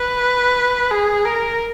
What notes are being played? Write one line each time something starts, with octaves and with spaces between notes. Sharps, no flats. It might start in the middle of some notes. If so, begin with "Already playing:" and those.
Already playing: B4
G#4
A#4